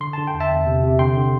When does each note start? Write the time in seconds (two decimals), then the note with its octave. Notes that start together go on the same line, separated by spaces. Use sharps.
0.01 D3 C6
0.13 D3 A5
0.27 G5
0.34 E2
0.40 E5 A5
0.50 E2
0.66 C3
0.83 C3
0.99 D3 G5 C6
1.17 D3